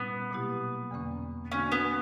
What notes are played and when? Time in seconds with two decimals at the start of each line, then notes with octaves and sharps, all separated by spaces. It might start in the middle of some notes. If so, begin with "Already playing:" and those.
Already playing: A#2 G3 B3 C#4 E4
0.31 B2 F#3 A#3 E4 G4
0.91 E2 D3 A#3 C#4
1.51 D3 A#3 C#4 D4 F#4
1.72 B3